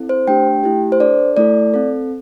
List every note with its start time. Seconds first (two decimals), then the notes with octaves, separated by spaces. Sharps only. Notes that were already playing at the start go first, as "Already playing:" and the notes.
Already playing: C4 E4 A4
0.09 C5
0.27 A3 D4 G4 G5
0.63 A3 E4 G4
0.92 C5
1.00 D4 A4 D5
1.37 A3 E4 A4 D5
1.74 C4 A4